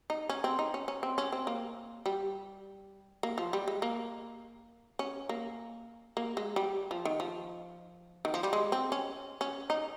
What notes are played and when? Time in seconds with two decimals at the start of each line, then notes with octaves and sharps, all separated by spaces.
0.10 D#4
0.29 C#4
0.44 C4
0.59 D#4
0.74 C#4
0.88 C#4
1.03 C4
1.18 C#4
1.32 C4
1.47 A#3
2.06 G3
3.23 A#3
3.38 F3
3.53 G3
3.68 G#3
3.82 A#3
4.99 C#4
5.29 A#3
6.17 A#3
6.37 G#3
6.56 G3
6.91 F3
7.05 D#3
7.20 F3
8.25 D#3
8.34 F3
8.43 G3
8.53 G#3
8.72 C4
8.92 C#4
9.41 C#4
9.70 D#4